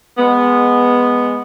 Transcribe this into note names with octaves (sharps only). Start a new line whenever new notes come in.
G#3 B3